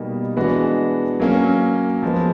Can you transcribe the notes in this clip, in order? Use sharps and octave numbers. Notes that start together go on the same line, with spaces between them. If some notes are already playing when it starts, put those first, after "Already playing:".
Already playing: B2 G3 A#3 D#4
E3 G#3 B3 D4 F#4
F#3 A#3 C#4
F3 G#3 B3